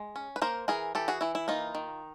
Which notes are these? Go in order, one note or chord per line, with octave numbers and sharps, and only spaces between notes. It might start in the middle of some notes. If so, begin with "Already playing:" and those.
Already playing: G#3
C#4
B4
A#3 A#4 C5
E3 G#4 A#4
E3 G4 A4
F#4 G#4
E3 E4
E4
A#3 D#4 F4
D#3